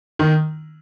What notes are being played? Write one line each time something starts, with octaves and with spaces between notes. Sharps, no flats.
D#3